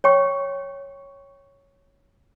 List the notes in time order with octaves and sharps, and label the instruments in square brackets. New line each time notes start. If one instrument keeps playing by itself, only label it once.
[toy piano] C#5 G5 C#6